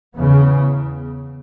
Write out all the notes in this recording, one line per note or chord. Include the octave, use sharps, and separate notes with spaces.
E2 C#3 B3